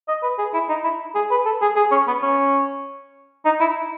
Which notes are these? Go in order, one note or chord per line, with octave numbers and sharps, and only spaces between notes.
D#5
B4
G#4
E4
D#4
E4
G#4
B4
A4
G#4
G#4
C#4
B3
C#4
D#4
E4